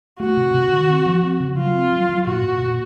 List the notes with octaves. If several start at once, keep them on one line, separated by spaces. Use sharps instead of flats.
A3 F#4
C3
C3
D#3
C4
F3
C4
C#3
F#3 F4
C4
F#3
F#3
A#2 F#4
A#2
A#2